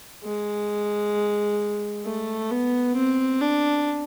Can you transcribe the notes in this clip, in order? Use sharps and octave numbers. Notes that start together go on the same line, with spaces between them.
G#3
A3
B3
C4
D4